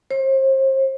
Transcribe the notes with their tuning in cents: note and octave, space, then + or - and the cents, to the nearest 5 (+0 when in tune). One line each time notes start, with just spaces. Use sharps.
C5 +35